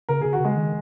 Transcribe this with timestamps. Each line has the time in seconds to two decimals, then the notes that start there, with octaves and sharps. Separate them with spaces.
0.09 C#3 A#4
0.21 C#3 G#4
0.33 F#4
0.40 C#3 G#3
0.56 D#3